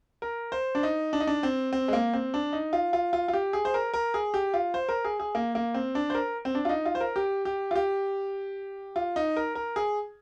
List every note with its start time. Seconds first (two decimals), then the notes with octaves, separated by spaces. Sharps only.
0.22 A#4
0.52 C5
0.75 D4
0.83 D#4
1.13 D4
1.20 D#4
1.27 D4
1.43 C4
1.73 C4
1.88 G#3
1.93 A#3
2.14 C4
2.34 D4
2.53 D#4
2.73 F4
2.93 F4
3.13 F4
3.28 F4
3.33 G4
3.53 G#4
3.65 C5
3.74 A#4
3.94 A#4
4.14 G#4
4.34 G4
4.54 F4
4.74 C5
4.89 A#4
5.05 G#4
5.20 G#4
5.35 A#3
5.55 A#3
5.74 C4
5.95 D4
6.10 C5
6.15 A#4
6.45 C4
6.55 D4
6.65 F4
6.69 D#4
6.86 F4
6.95 C5
7.01 A#4
7.16 G4
7.45 G4
7.71 F4
7.76 G4
8.96 F4
9.16 D#4
9.37 A#4
9.55 A#4
9.76 G#4